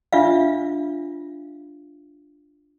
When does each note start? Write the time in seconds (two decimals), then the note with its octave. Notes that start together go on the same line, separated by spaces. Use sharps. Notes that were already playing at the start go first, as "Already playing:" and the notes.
0.13 D4 F4 E5 F5